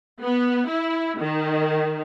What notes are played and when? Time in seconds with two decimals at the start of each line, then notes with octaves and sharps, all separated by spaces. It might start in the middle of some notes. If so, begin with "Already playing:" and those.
0.22 B3
0.68 E4
1.19 D#3